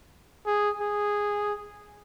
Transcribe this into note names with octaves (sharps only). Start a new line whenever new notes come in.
G#4
G#4